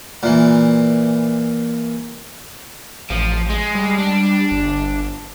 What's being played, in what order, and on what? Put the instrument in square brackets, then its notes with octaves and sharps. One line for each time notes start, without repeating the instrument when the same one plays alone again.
[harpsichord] A#2 E3
[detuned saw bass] A1 [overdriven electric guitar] F3
[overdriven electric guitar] G#3
[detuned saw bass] G3
[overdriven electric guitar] D4
[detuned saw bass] G1